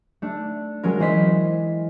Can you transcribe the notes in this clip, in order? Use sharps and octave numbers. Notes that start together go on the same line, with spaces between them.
A3 D4
F#3 G#3 C#4 A#4
E3 G#4 C5 D#5 B6 C7